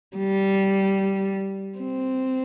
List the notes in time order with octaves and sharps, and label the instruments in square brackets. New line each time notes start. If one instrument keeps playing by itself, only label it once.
[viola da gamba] G3
C4